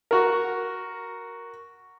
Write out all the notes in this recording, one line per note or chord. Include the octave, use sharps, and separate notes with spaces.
F#4 A#4